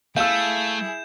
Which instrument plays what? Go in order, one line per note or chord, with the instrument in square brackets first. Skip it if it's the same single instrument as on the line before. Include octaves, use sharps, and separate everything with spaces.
[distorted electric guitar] A3 [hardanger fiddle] E4 G#4 [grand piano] F5 E6 [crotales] G6 E7